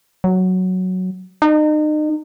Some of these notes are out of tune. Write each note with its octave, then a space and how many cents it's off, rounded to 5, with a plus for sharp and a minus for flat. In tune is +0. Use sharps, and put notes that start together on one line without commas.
F#3 +0
D#4 -35